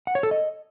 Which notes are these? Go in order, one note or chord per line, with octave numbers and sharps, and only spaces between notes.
F#5
C#5
A4
D#5